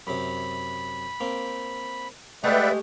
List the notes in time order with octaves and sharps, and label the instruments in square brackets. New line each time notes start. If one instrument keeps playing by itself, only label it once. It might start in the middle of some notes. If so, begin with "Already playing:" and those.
[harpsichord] F#2 C3 [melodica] B5
[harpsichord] A#3 C4
[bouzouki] G#3 G4 [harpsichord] A3 [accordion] B4 D5 E5 [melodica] F#5 G5